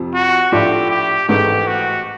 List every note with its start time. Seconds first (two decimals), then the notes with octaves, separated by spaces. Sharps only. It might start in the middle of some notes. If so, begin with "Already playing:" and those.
Already playing: F2 C3 F3
0.14 F#4
0.52 A2 F3 A3 D4 F4 G4
0.91 G4
1.28 A1 G#2 E3 A3 G4
1.67 F#4